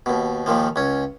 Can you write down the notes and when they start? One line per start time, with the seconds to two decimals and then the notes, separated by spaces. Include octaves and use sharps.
0.06 D#2 B2
0.46 D#2 A#2 D#3 F3
0.76 C#2 C#4